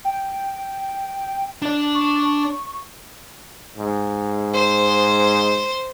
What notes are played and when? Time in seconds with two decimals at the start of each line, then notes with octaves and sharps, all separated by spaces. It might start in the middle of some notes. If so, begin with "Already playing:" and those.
0.05 G5
1.62 D4 D5
1.95 C#6
3.77 G#2
4.54 C5